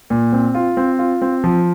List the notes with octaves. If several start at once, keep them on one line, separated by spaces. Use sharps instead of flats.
A#2
C4
F4
C4
F4
C4
F3